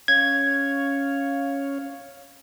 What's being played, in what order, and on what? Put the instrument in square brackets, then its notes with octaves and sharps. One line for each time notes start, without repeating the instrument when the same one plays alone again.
[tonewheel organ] C#4 C#5 F5 [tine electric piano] G#6